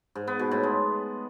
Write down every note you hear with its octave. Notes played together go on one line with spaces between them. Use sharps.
G#2
B3
B2
A2
G#3